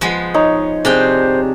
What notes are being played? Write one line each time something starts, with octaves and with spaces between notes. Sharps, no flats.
F3 G#3 B3
D#4 C#5 D#5
C3 D4 G#4 C5 D5 D#5 G5